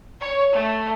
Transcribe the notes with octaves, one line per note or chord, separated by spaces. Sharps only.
C#5
A3